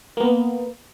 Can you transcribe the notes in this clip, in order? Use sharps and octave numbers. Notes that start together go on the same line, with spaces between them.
A#3 B3